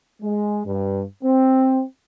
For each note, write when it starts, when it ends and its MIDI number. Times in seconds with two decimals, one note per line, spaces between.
0.22 0.62 56
0.66 1.02 43
1.23 1.82 60